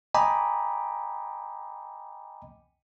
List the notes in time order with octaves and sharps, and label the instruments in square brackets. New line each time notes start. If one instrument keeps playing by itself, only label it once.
[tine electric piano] D#5 G5 G#5 A#5 B5 D6